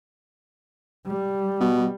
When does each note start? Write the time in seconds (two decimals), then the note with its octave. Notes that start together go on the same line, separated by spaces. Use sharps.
1.07 G3
1.61 B2